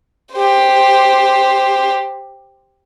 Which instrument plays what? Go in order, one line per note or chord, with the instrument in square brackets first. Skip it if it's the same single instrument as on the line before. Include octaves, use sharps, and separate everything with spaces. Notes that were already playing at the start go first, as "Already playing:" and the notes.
[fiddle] G4 C5